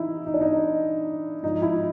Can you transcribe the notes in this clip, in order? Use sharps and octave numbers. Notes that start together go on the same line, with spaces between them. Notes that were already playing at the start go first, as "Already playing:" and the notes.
Already playing: E3 D#4 E4
D#4
D4
D#4
G#2 F3 D#4
E4